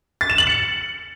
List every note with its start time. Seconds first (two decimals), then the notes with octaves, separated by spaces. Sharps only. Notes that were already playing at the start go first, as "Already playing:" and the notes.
0.21 A6
0.30 E7
0.38 F#7
0.47 C#7